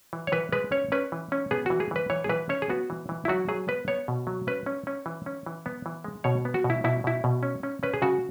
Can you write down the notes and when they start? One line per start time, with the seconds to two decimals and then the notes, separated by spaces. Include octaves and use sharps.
0.13 E3
0.27 C#5
0.32 E3 B4
0.52 G#3 B4
0.72 C#4 C#5
0.92 C#4 B4
1.12 E3
1.32 C#4
1.51 B3 G#4
1.66 E3 F#4
1.80 G#4
1.91 E3 B4
2.10 E3 C#5
2.24 G#4
2.29 E3 B4
2.49 C#4 C#5
2.62 G#4
2.70 B3 F#4
2.90 E3
3.09 E3
3.25 E4
3.28 F#3 F#4
3.49 F#3 G#4
3.68 B3 B4
3.88 B3 C#5
4.08 B2
4.27 F#3
4.47 C#4 B4
4.66 C#4
4.87 C#4
5.06 E3
5.26 C#4
5.46 E3
5.66 B3
5.86 E3
6.04 G#3
6.24 B2 C#5
6.45 B3
6.54 F#4
6.64 B2
6.70 E4
6.84 B2 E4
7.04 B2 E4
7.24 B2
7.43 C#4
7.63 C#4
7.83 C#4 B4
7.94 G#4
8.02 C#3 F#4